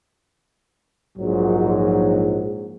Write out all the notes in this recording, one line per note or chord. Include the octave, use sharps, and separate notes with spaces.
A#1 G#2 F#3